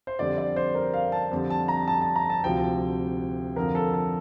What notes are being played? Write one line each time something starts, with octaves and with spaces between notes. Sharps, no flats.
C5
F2 D3 G3 D5
D5
C5
A#4
F5
A5
F2 D3 G3
A5
A#5
A5
A5
A#5
A5
D2 C3 F3 G5
F2 D3 F3 A#4
A4
A4